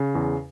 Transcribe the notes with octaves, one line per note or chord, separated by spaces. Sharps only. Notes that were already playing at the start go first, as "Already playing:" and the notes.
Already playing: C#3
E2